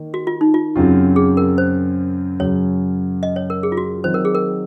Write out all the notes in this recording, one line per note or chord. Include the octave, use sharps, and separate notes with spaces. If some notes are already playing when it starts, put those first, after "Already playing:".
Already playing: D#3 A#3
F#4
F4
D#4
F4
F#2 C#3 F#3 C4 F4
G#4
A#4
C5
F#2 C#3 F#3 C#4 C#5
D#5
C#5
A#4
G#4
F4
F#4
D#3 F#3 C4 F4 C5
A#4
G#4
A#4